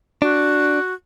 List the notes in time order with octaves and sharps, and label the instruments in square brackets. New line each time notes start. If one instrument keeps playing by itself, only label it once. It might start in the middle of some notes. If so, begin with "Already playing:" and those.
[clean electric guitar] D4 [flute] F#4